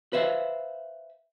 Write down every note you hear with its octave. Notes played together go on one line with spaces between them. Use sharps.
B4 C5 E5 F5